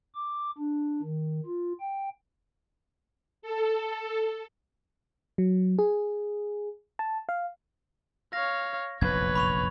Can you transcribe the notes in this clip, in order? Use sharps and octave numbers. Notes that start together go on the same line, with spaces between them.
D6
D4
D#3
F4
G5
A4
F#3
G#4
A5
F5
C#5 F5 A#6
F1 A#1 F#2 B4 C#5 G#6
B5 C#6 F7